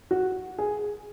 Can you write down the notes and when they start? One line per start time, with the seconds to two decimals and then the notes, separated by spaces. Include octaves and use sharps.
0.11 F#4
0.58 G#4